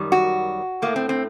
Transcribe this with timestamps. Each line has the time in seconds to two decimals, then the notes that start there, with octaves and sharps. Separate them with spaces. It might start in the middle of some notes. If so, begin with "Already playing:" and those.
Already playing: F#2 D#3 G3
0.12 F#4
0.82 A2 A3 A#3
0.96 C4
1.09 C4